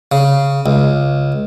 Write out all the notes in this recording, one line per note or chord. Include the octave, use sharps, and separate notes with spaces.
C#3
C#2